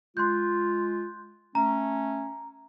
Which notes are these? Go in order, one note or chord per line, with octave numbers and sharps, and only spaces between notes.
G#3 F4 C6 F#6 G6
A3 C#4 A#5